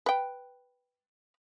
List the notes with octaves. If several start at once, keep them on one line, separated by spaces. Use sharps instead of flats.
B4 G5